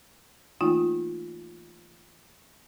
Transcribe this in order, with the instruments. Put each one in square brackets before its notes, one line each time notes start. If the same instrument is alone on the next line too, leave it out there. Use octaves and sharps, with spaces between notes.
[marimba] E3 A3 A#3 D#4 F4